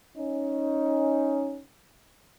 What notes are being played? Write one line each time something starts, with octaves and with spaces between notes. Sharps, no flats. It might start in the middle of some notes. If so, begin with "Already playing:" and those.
C#4 D#4